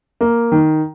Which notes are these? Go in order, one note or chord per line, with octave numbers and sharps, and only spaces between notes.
A#3
D#3